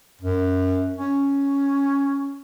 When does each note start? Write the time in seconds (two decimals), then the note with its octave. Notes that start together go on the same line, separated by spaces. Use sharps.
0.21 F#2
0.97 C#4